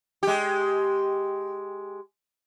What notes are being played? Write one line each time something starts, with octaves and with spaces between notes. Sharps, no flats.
G#3 G4